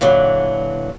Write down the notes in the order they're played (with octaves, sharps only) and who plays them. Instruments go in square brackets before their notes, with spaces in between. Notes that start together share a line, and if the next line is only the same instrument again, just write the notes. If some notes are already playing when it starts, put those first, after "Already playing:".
[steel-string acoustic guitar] A#2 D3 E3 F#3